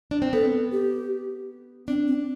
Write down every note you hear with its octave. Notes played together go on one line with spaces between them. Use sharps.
D4
C4
B3 A4
G4
C4 D4
C4